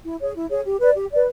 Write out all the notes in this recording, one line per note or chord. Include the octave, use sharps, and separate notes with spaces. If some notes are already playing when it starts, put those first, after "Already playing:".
E4
G#4 C#5
E4
G#4 C#5
G4
B4 D5
G4
B4 D5